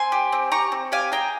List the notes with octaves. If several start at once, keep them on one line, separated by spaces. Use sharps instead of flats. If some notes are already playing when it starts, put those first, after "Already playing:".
Already playing: C4 G#5 C6
G4
C4
G4 A#5 C#6
C4
G4 F5 G#5
G#4 G5 A#5